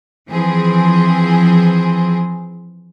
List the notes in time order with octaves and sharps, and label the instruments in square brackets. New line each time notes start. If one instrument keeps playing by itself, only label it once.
[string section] E3 F3 C4 G#4